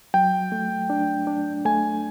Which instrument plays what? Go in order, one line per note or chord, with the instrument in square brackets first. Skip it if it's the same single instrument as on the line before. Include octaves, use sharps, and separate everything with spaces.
[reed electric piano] F#3 [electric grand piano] G5
[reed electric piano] A3
D4
D4
[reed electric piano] A3 [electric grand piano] G#5